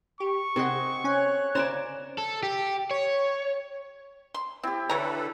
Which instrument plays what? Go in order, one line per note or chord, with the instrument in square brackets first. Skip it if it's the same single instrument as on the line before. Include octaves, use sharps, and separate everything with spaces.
[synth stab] G4 [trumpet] C#6
[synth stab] C3 F#5 [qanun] C4 G#4 D#5
[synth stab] C#4 G#5 [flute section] C#5 F#6
[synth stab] C#3 C5 E7 [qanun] D5 G#5 A#5
[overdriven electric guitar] A4
G4
C#5
[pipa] C6
[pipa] C4 [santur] E4 G4
[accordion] D3 A4 B4 [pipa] E3 C#5 A#5